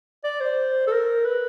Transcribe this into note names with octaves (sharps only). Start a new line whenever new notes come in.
D5
C5
A4
A#4
B4